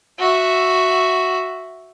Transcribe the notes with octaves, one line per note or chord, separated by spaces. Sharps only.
F#4 E5